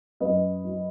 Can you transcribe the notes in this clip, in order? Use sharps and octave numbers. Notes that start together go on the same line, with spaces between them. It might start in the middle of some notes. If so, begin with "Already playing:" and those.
F#2 B4 D#5
F#3